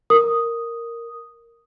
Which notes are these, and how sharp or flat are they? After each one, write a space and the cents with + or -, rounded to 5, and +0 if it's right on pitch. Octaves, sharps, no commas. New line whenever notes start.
A#4 -5 D#6 +0